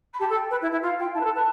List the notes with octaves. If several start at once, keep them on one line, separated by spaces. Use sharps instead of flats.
B5
G4 A5
A4
G5
B4
E4
E4
F4 F5
F4 G5
E4 A5
B4
A4
B4